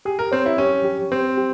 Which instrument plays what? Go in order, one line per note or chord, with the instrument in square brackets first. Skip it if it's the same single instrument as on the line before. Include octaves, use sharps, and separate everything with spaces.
[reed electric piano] G4 [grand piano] G#4
[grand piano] A#4
[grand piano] C4 [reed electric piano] C#5
[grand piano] E4
[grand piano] C#4 [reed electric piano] G4
[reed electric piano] G4
[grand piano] C4 [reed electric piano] G4
[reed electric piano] G4